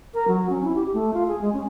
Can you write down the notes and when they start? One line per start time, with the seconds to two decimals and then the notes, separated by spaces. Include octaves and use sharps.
0.14 A#4
0.28 F#3
0.49 C#4
0.64 E4
0.75 G4
0.93 A3
1.13 F4
1.28 G#4
1.41 G#3
1.53 C#4